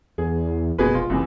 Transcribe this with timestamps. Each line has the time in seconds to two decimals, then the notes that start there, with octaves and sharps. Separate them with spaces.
0.18 E2 G#4
0.78 F#1 B2 G#4 B4
0.94 F1 F4
1.10 F#1 C2 C3 E3